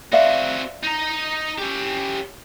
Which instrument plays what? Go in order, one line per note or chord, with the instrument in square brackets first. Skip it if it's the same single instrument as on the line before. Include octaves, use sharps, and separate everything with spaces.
[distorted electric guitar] C4 F#4 [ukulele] D5 E5 F5
[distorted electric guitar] D#4 A#5
C#4 G4